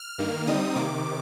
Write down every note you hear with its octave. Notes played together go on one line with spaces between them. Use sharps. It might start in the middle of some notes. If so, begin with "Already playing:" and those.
Already playing: F6
G2 D#3 A#3
D3 G3 C4 D#4 D#6
C3 D#3 A#3 D6